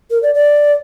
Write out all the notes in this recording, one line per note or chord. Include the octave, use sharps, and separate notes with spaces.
A#4
D5
D5